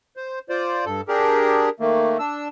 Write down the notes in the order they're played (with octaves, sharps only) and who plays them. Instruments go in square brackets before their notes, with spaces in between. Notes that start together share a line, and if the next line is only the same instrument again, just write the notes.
[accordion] C5
F4 C5 D5
G2 A4
D4 G4 G#4 A#4
D#3 A3 A#3
D4 E6